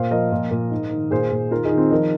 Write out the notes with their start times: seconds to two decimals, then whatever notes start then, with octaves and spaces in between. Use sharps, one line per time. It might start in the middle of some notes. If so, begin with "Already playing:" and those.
Already playing: A#2 C5 F5
0.11 F3 A#4 D#5
0.32 A#2
0.51 A#2
0.71 G#2
0.91 D#3
1.11 A#2 G#4 C5
1.31 A#2
1.51 D#3 F4 A#4
1.65 D#4 G#4
1.71 D#3
1.77 C4 F4
1.91 F3 A#4 D#5